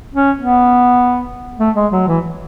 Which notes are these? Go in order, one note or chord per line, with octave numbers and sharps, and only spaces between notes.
C#4
B3
A3
G#3
F#3
E3